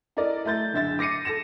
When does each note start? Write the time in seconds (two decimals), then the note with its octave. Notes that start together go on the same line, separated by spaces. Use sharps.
0.17 E4 A4 A#4 D5 D#5
0.45 A3 E4 G6 A6
0.73 F#1 D3 E5 A6
0.99 D6 A#6 C7 C#7 D#7
1.25 A4 A#6 E7